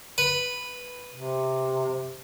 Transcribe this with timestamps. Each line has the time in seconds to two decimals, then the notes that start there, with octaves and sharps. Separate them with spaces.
0.18 B4
1.14 C3